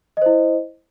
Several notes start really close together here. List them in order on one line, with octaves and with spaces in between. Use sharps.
D#5 C5 E4